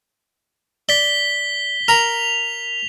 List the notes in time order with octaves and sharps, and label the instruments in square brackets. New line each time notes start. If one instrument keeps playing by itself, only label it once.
[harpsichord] D5 [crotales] B6 G7
[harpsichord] A#4 A#5 B5 [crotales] F7